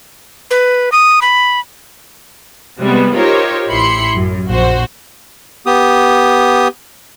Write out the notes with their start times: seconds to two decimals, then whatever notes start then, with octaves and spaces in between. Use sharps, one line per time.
0.51 B4
0.92 D#6
1.22 B5
2.80 C3 G3 G#3 B3
3.15 D#4 F4 G4 A#4 C5 C#5
3.68 A1 E4 G4 B5 C6 C#7
4.15 F#2
4.48 A#1 F#4 C5
5.66 B3 G4 D#6